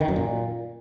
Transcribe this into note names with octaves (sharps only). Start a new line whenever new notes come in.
D#3
F#2
A#2